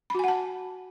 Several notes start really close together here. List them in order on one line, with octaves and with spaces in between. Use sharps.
B5 F#4 G#5 F#5 A5